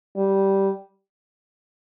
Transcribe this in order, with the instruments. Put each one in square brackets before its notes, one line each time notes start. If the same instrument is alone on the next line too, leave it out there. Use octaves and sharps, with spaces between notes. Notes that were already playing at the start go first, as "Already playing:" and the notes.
[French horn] G3